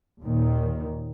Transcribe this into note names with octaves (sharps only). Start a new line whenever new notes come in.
D#2 A#2 D#3